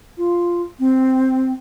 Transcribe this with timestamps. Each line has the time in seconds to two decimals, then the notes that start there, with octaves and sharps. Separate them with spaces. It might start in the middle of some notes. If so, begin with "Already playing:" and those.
0.17 F4
0.79 C4